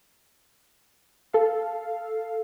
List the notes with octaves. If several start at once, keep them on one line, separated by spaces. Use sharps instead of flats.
A4 F5